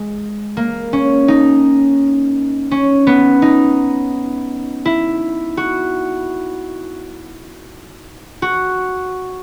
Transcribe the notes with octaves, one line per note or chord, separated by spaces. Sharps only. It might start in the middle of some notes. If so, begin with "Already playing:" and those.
Already playing: G#3
A#3
C#4
D#4
C#4
B3
D#4
E4
F#4
F#4